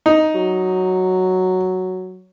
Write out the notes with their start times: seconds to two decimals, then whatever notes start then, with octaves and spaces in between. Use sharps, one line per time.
0.06 D#4
0.34 F#3